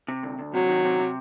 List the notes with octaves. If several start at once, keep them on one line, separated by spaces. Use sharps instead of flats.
C3
D2
D2
C3 F#3
D#3
C3
C3